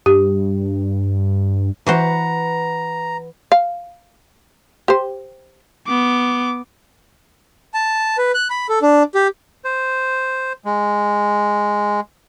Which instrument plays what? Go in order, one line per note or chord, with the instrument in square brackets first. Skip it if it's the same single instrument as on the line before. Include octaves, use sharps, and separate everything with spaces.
[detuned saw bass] G2 [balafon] G4
[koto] E3 F#4 C5 [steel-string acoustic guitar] B4 F#5 [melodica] A#5
[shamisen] F5
G4 C5
[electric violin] B3 D6
[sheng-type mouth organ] A5
B4
F#6
B5
A4
D4
G4
[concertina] C5
G#3